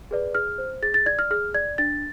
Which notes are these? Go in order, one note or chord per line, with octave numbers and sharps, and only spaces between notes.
G#4 B4 D5
G#4 F6
C5
G#4 A6
A6
D5 G#6
F6
G#4 F6
D5 G#6
D4 A6